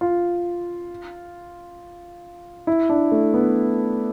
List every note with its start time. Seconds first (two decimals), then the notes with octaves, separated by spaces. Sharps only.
0.01 F4
2.67 E4
2.89 D4
3.12 A3
3.34 B3